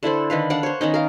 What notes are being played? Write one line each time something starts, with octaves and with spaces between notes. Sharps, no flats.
D3 E4 A4 C5
D3 D#3 B4 F5
D4 D5 F5 F#5
C5 C#5
D#3 B3 C#4 D#4
A#4 F5